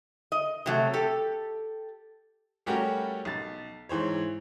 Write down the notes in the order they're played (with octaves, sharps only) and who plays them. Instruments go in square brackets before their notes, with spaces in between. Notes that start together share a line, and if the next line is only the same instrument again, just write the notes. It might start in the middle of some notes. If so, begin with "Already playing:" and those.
[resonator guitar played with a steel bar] D#5
C3 F#3 A3
G4 A4
[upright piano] G3 A3 C#4 F#4 G4 A#4
B1 A6
G#2 E3 C5 C#5